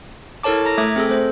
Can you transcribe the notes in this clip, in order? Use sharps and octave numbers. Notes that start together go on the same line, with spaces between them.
E4 A4 A#4 C#5 A5 D6
A#5 A#6
A3 E5 D6 D#6 G#6
C4 G#4 A4
A3 C5